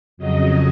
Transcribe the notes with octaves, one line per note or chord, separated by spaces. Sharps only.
F2 C#3 F#3 D#5